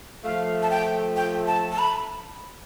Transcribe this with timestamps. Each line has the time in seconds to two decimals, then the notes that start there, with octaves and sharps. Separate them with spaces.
0.24 F3 A3 F5
0.62 A5
0.70 G5
1.16 G5
1.47 A5
1.71 A5
1.79 B5